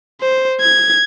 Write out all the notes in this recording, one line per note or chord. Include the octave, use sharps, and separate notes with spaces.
C5
G#6